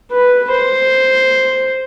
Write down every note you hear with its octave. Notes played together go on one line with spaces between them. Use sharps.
B4
C5